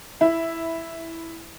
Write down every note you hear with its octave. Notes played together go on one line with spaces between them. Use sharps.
E4